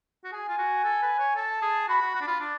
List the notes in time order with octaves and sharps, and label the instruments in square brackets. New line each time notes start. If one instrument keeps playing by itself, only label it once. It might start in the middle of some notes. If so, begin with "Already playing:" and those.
[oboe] F#4
[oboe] G#4 [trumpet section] G#5
[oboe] F4
F#4
A4
B4
C#5
[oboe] A4 [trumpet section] A5
[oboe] G#4
[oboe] F#4 [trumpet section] B5
[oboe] F#4
F#4
D4
F4
D4